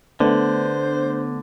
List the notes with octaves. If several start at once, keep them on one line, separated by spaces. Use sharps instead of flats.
D3 A3 B3 D4 C5